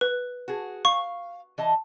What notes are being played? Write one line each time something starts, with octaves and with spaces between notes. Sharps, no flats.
B4
F#4 G#4
F5 C#6
E3 D#5 A5